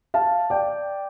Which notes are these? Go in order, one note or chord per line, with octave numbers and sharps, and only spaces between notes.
F5 A5
D5 G5